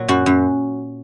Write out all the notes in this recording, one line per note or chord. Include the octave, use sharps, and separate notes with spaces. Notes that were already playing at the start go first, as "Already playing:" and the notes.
Already playing: A#2 F#3
F#2 F#4
F#2